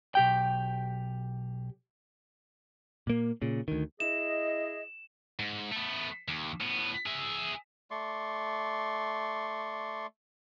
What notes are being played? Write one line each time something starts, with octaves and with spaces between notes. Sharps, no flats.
B1 G4 G5
A#2 A#3
A#2 C#3
D2 D#3
E4 G#4 D#5 E7
G#2
A3 B3
D#2
A2 B3
G#4 E5
A3 D5 C6 C#6